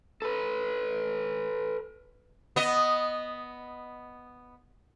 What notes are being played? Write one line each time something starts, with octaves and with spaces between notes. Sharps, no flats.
A4 B4
B3 D#5